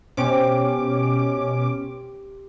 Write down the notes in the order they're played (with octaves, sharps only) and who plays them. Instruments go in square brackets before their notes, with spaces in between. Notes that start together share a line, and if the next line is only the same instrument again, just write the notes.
[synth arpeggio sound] B2 C#4 D6 [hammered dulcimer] G4 C5